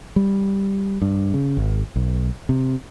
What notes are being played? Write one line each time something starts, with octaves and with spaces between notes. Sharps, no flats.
G3
G2
C#3
G#1
B1
C3